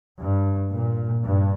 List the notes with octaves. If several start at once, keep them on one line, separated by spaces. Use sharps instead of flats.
G2
A#2
G2